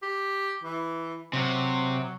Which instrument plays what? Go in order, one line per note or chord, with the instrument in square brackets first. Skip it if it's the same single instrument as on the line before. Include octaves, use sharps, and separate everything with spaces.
[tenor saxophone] G4
E3
[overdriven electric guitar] C3 [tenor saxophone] F#3